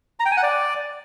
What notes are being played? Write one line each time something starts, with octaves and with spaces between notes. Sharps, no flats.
A#5
G5
G#5
F#5
D5